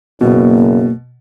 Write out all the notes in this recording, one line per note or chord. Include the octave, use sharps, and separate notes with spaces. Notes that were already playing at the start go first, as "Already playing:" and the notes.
F#1 B2 A#3